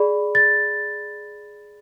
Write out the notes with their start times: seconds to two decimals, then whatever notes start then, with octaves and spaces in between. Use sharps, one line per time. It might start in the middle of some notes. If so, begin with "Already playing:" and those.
Already playing: G#4 D5 B5
0.35 A6